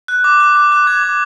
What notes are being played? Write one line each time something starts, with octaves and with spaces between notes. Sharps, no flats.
F#6
D6
F#6
D6
F#6
D6 G#6
D6